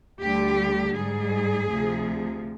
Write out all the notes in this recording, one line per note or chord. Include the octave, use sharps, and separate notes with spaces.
D2 D3 G3 G4
G#2 G3 G#4
D2 C3 F3